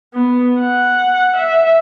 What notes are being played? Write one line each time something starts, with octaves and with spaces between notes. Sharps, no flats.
B3
F#5
E5